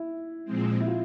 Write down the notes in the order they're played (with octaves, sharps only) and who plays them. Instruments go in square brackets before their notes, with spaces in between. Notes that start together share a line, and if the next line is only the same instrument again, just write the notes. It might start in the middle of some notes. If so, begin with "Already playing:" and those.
Already playing: [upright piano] E4
[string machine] A#2 F3 G#3 C4
[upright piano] E4
F4